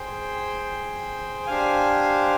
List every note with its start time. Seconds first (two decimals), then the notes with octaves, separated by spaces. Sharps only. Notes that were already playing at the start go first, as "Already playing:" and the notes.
Already playing: G#4 C5 G5
1.46 D4 G4 C5 F5 G#5